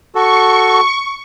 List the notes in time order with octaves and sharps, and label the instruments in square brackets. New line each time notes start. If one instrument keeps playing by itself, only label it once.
[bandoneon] F#4 A4 [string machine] C#6